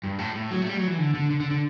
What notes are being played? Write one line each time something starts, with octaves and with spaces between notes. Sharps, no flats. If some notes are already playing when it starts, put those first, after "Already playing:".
G2
A2
A2
F#3
A3
G3
F#3
E3
D3
D3
D3
D3
D3